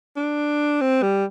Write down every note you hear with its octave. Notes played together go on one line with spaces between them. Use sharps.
D4
C4
G3